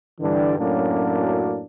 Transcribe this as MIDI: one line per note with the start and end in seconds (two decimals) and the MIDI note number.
0.20 0.57 43
0.20 0.57 50
0.20 0.57 52
0.20 0.57 55
0.20 0.57 62
0.59 1.63 42
0.59 1.63 45
0.59 1.63 54
0.59 1.63 58
0.59 1.63 61
0.59 1.63 62